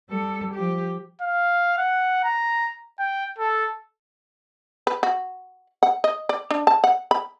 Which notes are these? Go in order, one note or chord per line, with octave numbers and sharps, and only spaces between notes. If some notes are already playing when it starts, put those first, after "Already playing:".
G3 A4
F3 G4
F5
F#5
A#5
G5
A4
B4
F#4
F#5
D#5
D5
D4
A5
F#5
B5